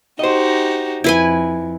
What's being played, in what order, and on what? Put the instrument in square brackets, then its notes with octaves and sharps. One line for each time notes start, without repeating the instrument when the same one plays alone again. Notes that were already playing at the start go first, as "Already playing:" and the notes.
[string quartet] D#4 F#4 G4 [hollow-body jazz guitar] C5 D#5
[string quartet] F2 [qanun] E4 B4 G#5